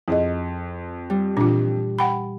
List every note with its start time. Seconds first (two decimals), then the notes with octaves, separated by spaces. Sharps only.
0.08 F2 E4 G#4 D#5
1.10 G3
1.37 A#2 E3 D4 F4
1.99 F#5 G5 B5